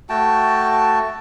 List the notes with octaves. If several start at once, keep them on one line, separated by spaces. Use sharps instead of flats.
A3 F#4 G5 A5